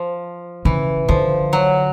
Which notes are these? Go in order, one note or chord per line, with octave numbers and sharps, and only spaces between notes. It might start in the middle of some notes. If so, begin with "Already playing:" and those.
Already playing: F3
C#3 E3
D3 F3
F#3